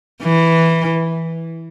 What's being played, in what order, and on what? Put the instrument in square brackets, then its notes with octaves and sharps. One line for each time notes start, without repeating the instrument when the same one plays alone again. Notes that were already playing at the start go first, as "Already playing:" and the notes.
[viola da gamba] E3